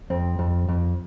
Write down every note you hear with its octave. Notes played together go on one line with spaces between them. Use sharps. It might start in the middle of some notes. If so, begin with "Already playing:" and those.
F2 C4
F2
F2